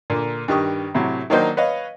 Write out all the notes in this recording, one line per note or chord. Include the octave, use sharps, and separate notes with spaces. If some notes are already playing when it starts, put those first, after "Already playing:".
A#2 D3 A#3
G2 D#3 G4 C#6 D#6
A2 C3 F#3
D#3 F#3 A#3 D4 D#4 C5
B4 C#5 D#5 F5